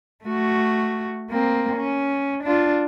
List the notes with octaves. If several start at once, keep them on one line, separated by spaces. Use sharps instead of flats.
A3 F#4
A#3 C4
C#4
D4 F4